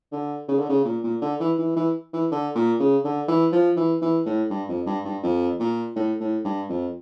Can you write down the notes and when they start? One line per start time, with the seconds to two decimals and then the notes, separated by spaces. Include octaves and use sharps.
0.12 D3
0.49 C#3
0.59 D3
0.69 C#3
0.85 A#2
1.03 A#2
1.22 D3
1.40 E3
1.58 E3
1.76 E3
2.13 E3
2.32 D3
2.55 A#2
2.80 C#3
3.04 D3
3.28 E3
3.52 F3
3.77 E3
4.02 E3
4.26 A2
4.50 G2
4.68 F2
4.86 G2
5.05 G2
5.23 F2
5.60 A#2
5.96 A2
6.20 A2
6.45 G2
6.69 F2